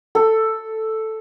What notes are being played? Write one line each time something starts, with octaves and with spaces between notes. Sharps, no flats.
A4